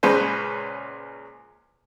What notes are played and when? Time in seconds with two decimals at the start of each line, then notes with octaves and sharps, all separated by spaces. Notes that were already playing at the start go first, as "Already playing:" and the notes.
0.03 C#2 A#2 G#3 C#4 B4 C5